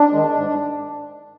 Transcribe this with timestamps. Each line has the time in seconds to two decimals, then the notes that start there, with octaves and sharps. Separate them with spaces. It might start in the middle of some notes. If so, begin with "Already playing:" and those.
Already playing: D4
0.12 D#3 G#3
0.36 G#2